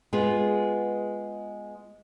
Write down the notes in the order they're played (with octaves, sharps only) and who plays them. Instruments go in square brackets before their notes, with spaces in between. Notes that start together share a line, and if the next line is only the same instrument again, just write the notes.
[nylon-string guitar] G#3 B3 F4 G#4